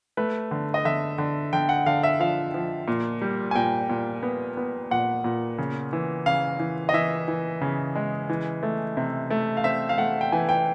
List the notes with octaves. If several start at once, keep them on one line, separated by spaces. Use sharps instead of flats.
A3 B4
D3
D#5
D3 E5
D3
D3 G5
F#5
D3 F5
E5
F3 F5
F3
A#2
G3
G#5
A#2 G5
A#2
B3
B3
A#2 F#5
A#2
C#3
E3
C#3 F5
E3
D#5
E3 E5
E3
C#3
G#3
E3
A3
C3
A3
F5
C4 E5
F5
A3 F#5
G5
E3 G#5
G5